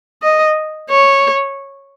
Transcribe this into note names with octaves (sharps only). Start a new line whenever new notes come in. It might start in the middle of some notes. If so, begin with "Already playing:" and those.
D#5
C#5